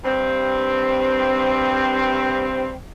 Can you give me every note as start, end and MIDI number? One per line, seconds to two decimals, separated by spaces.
0.04 2.72 43
0.04 2.72 60